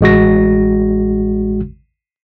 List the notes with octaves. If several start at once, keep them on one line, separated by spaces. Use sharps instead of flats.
A1 G#3 F#4 A#6